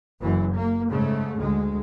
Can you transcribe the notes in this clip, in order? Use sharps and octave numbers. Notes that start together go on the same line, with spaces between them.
F#1 F#2 E3
A#3
G#2 C#3 A3
D2 G#3